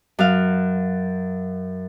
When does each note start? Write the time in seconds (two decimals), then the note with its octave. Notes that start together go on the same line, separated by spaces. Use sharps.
0.19 F#2 F5